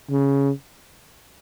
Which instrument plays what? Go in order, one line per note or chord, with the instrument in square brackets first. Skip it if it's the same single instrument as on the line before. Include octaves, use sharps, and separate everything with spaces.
[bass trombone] C#3